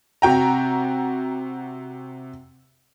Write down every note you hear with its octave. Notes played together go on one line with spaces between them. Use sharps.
C3 F#4 G5 A#5